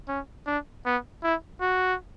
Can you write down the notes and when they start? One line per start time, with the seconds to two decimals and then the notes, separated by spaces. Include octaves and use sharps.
0.08 C#4
0.46 D4
0.85 B3
1.23 E4
1.61 F#4